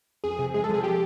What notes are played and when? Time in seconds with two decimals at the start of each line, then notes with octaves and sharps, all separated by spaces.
0.24 F2 G#4
0.39 C3
0.54 G#3 G#4
0.64 A4
0.69 F3 G#4
0.84 G4